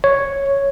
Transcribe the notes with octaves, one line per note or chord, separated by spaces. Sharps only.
C#5